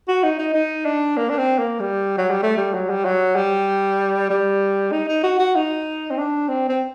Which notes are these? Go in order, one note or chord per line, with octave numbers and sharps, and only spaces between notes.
F#4
D#4
D#4
D#4
D4
A#3
D4
C4
A#3
G3
F#3
G3
A3
G3
F#3
G3
F#3
G3
G3
D#4
D#4
F#4
F#4
D#4
C4
D4
C4
C4